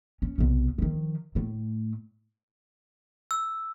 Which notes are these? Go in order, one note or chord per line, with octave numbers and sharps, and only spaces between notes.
C#4
B1 C3
D#3 F3
A2 A3
E6